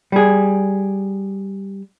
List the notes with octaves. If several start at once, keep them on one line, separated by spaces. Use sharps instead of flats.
G3 G#4